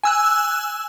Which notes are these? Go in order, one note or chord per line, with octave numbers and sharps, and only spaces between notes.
G#5 E6 F#6